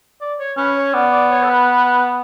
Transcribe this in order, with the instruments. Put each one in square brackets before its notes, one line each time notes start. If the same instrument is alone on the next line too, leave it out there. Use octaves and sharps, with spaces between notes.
[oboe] D5
C#5
[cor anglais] C#4 [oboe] B4
[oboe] C#5
[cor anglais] B3 [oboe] D5
[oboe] D5
C#5
A4
B4